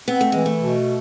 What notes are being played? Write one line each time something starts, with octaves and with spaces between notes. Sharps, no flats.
B3 C4
A3
E3 G#3
A3
B2